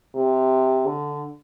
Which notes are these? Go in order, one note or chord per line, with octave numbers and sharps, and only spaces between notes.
C3
D3